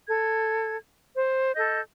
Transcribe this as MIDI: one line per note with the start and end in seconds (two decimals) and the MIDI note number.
0.09 0.77 69
0.09 0.77 92
1.16 1.52 72
1.56 1.81 69
1.56 1.81 75
1.56 1.81 91